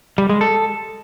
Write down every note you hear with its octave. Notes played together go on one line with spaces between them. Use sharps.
G3
G#3
A4